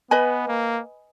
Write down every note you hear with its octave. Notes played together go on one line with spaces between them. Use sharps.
B3 B4 D#5 G#5 B5
A#3